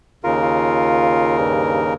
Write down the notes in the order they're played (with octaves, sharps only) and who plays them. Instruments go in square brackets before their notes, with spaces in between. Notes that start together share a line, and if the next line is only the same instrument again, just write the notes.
[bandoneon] D#2 C#3 A#4 [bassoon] F4
[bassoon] F4
G2